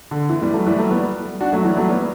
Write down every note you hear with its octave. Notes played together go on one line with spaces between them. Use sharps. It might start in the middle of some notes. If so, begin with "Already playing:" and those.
D3
E3
E3 G3
F#3 A3
E3 G3
F#3 A3
G3 B3
D4 F#4
F#3 A3
E3 G3
F#3 A3
G3 B3